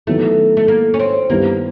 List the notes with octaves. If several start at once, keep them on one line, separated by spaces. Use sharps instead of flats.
D#3 F#3 A3 B3 E4
A3
A#3
C#4
C4
G2 D#3 G3 A#3 B3 E4